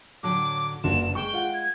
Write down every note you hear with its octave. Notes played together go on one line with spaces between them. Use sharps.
A2 D3 F#3 D6
F#1 G2 A#3 D4 F#4 C6 E7
G#3 G5 C#6
F4 F#5
G#6